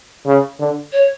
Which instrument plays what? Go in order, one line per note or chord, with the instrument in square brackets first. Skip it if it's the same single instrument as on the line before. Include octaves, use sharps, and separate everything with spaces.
[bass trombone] C#3
D3
[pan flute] C#5